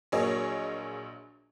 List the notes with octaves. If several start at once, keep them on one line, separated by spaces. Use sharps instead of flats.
A#1 F#3 A#3 G#4 C#5 D#5